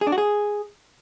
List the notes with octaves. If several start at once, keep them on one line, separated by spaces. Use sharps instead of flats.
G#4
D4
F#4
G#4